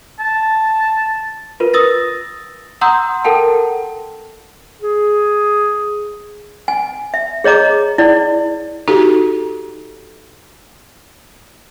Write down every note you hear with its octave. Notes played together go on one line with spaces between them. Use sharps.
A5
F4 A#4 B4
D#6 E6 A6 A#6
F#5 A#5 C6 D#6 E6 G6
A4 A#4 F#5 G5 A5
G#4
G#5
E5
G#4 C#5 D#5 A#5 D6
E4 D5
D#4 F#4 G4 A4